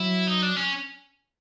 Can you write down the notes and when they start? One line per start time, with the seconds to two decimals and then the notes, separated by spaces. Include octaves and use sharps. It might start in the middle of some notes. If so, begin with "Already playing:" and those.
Already playing: F#3 E4
0.28 D#4
0.43 D4
0.57 C#4